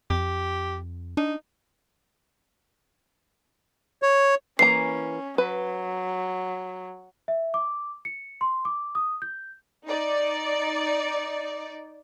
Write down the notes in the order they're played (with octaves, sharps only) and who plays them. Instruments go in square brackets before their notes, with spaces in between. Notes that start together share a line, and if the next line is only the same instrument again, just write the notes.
[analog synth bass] F2 [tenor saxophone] G4
[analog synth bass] D4 [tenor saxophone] D#4
[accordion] C#5
[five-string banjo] E3 A#3 A#5 [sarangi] C#4 [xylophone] C7
[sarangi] F#3 [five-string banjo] B4
[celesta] E5
D6
C#7
C6
D6
D#6
G6
[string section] D#4 D5